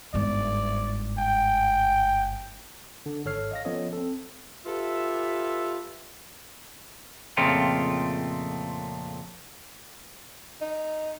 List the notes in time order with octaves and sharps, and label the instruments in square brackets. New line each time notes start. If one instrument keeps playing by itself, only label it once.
[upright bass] G1 G#2 [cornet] D5
[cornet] G5
[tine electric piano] D3
G#1 G#2 A4 C#5 F6 C7
D#5 F5 A#6
F3 B3 C#4 A4 C#5 D#5
C4 A4
[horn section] F4 G4 A4 B4 E5
[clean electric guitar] F2 A#2 C#3 A3 C4 F4
[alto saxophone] D#4